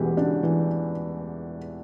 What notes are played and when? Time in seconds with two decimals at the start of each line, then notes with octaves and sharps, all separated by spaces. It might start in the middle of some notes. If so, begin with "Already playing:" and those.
Already playing: E1 E2 E3 E4 F#4 G4
0.17 C#3 D4
0.43 E3